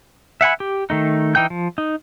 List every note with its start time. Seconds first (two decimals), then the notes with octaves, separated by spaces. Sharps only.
0.41 E5 F#5 G#5 B5
0.60 G4
0.90 D#3 A3 D#4
1.35 E3 D#4 G5 G6
1.50 F3
1.78 D#4